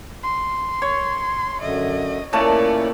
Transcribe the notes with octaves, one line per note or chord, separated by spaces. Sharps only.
C6
C#5
F#2 D3 D#5 E5
A#2 A3 C#4 E4 C#5 D5 A5